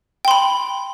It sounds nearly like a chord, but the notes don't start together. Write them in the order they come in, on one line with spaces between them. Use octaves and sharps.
G5 C6 B5